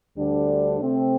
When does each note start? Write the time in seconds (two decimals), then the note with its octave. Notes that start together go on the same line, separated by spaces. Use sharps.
0.16 D2 D3 G3 D4
0.79 C3 A3 C4